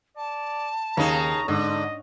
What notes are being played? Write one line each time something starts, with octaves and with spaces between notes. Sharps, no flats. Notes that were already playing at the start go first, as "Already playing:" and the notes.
D5 A5
D#2 C#3 D#4 A#5
G#2 D3 D#5